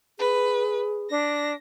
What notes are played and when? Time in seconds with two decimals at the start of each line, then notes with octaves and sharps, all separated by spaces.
0.19 G#4 B4
1.10 D4 A#6